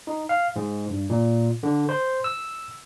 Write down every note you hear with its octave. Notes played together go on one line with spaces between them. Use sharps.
D#4
F5
G#2
G2
A#2
D3
C5
E6